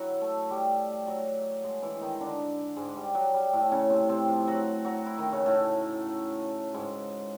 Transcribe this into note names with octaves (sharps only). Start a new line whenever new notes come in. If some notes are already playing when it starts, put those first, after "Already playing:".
Already playing: F#3 E4 F#4
A3 A4
G3 G4
F#3 F#4
G#3 G#4
E3 E4
D#3 D#4
D3 D4
G#2 G#3
G3
F#3
G3
A2 A3
C#3 C#4
C3 C4
C3 C4
F3 F4
F#3 F#4
F#3 F#4
E4
D#3 D#4
C#3 C#4
A2 A3
G#2 G#3